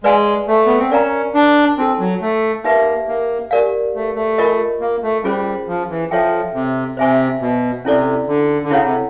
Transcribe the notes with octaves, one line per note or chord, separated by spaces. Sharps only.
G#3 B4 D5 F5 G#5
A3
B3
C4
C#4 A#4 D5 F5 A#5
D4
C4 D#4 F#4 A4
F#3
A3
A#3 D#4 G4 B4 E5
A#3
G4 A#4 D5 F5
A3
A3
F4 A#4 D#5
A#3
A3
G3 C#4 F4 G#4 C5
F3
E3
F3 A4 C#5 E5 G5
C3
C3 C5 E5 G#5 C#6
B2
C3 C#4 E4 A4 D5
D3
D3
C#3 E4 A4 C#5 F#5
C3